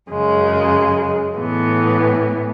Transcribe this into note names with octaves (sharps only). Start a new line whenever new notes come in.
F#2 C#3 G#3
A2 E3 B3